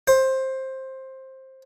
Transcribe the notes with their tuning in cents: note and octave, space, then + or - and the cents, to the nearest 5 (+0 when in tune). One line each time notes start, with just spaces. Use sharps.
C5 +15